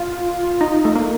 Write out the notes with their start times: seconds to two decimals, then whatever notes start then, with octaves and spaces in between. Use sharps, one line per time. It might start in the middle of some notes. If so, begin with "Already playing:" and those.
Already playing: F4
0.61 D#4
0.85 A3
0.95 A#3